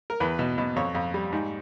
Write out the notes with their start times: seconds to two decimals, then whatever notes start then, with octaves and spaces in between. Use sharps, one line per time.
0.10 A#4
0.20 E2 B4
0.39 B2
0.58 B2
0.76 F2 C#5
0.95 F2
1.14 G3
1.32 G#2